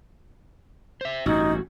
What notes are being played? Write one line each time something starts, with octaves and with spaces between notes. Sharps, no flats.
C5 E5
A1 G2 D#4 F#4